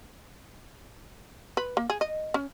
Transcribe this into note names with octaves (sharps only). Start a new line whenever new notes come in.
B4
A#3
G#4
D#5
C#4